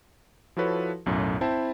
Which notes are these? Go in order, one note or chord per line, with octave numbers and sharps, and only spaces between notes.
F3 E4 F#4 A4 B4 C#5
B1 F#2 A2
C4 E4 C5 E5 G5 A5